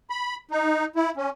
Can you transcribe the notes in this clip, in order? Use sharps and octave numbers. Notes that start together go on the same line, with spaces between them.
B5
D#4
E4
C#4